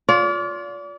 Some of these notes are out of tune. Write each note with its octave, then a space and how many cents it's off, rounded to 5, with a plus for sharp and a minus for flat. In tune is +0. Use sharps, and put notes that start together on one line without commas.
F4 +20 D5 -35